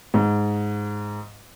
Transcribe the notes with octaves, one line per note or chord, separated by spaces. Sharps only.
G#2